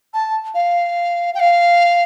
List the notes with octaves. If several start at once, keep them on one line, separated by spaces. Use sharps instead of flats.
A5
F5
G5
F5